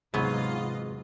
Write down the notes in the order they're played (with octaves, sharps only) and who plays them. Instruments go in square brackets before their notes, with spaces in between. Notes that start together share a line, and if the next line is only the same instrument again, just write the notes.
[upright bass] E2 C3 [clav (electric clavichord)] G#2 [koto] F#3 B3 [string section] F4 B4 D#5